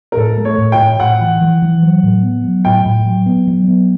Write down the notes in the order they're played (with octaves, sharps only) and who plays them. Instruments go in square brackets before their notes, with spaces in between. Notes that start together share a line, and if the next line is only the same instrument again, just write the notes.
[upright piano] A#4
[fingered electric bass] A2 [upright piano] A4
[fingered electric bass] A3
[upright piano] C#5
[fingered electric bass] A2
[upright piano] G5
[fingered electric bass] A2
[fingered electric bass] A2 [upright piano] F#5
[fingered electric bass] E3
E3
E3
F#3
A2
B3
F#3
[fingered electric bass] A2 [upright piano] G5
[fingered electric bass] A2
F#3
B3
F#3
B3